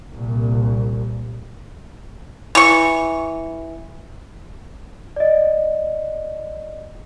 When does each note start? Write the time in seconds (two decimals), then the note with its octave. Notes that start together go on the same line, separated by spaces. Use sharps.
0.10 C2 A#2
2.55 E3 C#6
5.16 D5 D#5